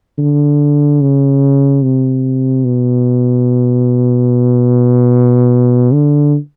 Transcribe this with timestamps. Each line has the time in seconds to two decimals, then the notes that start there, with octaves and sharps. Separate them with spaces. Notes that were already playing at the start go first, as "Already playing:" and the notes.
0.18 D3
1.01 C#3
1.82 C3
2.64 B2
5.93 D3